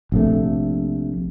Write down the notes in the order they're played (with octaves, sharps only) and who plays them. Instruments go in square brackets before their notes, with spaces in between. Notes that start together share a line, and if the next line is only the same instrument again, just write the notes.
[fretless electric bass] A#1 C3 A3